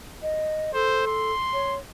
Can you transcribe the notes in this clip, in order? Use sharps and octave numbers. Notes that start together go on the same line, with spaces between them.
D#5
A4 C5
C6
C#5